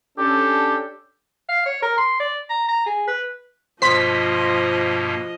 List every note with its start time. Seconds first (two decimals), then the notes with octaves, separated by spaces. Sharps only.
0.18 C#4 D4 G4 A4
1.49 F5
1.66 C#5
1.82 A#4
1.98 C6
2.20 D5
2.50 A#5
2.68 A#5
2.86 G#4
3.08 B4
3.82 G2 B2 F3 A#3 C5 D#5 C6 B6